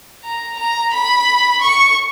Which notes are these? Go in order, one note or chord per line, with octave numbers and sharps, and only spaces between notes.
A#5
A#5
B5
C#6